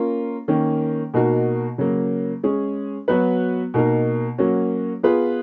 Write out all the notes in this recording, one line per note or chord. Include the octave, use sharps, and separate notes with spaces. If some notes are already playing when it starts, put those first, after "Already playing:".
Already playing: A#3 C#4 F4 A#4
D#3 A#3 C#4
B2 A#3 D#4 F#4 A#4
C#3 F#3 A#3
G#3 C#4 G#4
F#3 B3 F#4 B4
B2 A#3 D#4 A#4
F#3 A#3 C#4 F#4
B3 F4 G#4 B4